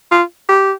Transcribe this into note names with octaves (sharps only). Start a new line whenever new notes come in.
F4
G4